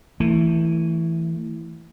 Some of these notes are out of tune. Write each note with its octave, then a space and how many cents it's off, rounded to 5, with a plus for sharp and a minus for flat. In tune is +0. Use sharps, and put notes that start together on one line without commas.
E3 +0 A3 +20